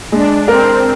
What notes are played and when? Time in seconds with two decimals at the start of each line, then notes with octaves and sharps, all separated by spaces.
0.12 G#3 D4
0.48 C4 A#4